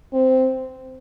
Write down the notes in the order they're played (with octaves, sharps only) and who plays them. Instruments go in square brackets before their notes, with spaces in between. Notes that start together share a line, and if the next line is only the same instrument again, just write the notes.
[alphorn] C4